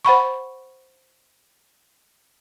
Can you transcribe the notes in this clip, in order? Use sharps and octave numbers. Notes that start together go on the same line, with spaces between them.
C5 F#5 B5 C#6